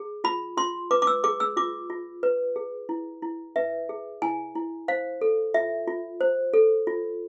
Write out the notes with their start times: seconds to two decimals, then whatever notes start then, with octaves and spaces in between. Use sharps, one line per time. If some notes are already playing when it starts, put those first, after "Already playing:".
Already playing: G#4
0.24 F4 B5
0.57 F4 C6
0.91 B4 D6
1.02 D6
1.07 E6
1.24 G#4 D6
1.40 E6
1.57 F4 D6
1.90 F4
2.23 B4
2.56 G#4
2.89 E4
3.22 E4
3.56 B4 E5
3.89 G#4
4.22 E4 G#5
4.55 E4
4.88 C5 F5
5.21 A4
5.54 F4 E5
5.88 F4
6.21 C5
6.53 A4
6.87 F4